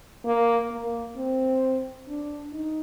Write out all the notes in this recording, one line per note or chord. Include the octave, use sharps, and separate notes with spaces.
A#3
A#3
C4
D4
D#4